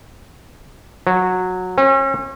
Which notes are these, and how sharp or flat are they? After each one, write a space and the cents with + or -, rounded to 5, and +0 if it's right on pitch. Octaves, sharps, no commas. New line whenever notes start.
F#3 -15
C#4 -40